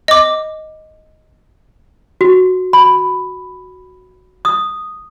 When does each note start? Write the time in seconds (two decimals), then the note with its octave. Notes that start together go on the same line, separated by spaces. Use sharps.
0.08 D#5 D6
2.21 F#4
2.73 B5
4.45 D#6